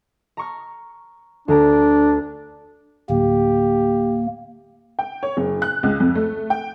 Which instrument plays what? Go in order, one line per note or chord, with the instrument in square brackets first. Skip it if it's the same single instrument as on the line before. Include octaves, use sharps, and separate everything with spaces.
[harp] A#5 C#6 F6
[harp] D2 A#5 D7 [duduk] D4
[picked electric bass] D1 [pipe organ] A#3 [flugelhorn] G4
[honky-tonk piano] G5
C#5
F#1
F#6
C#2
F2
A3
G5